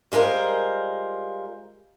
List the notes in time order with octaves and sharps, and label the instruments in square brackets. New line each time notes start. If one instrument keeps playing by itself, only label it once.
[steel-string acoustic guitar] G3 G#3 F4 A#4 C5